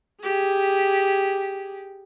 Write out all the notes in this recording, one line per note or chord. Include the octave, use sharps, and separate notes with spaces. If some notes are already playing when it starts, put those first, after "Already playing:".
G4 G#4